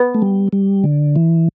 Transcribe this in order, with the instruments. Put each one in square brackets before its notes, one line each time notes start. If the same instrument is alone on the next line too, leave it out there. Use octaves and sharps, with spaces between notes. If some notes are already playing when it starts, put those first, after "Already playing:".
Already playing: [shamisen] B3
[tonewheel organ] A3
G3
G3
D3
E3